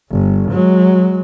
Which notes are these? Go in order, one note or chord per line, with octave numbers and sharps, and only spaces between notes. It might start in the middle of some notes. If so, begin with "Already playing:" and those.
G1
F#3 G#3